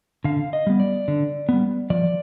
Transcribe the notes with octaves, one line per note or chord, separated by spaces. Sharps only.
D3 F5
D#5
G3 B3
D5
D3
G3 B3
F3 D5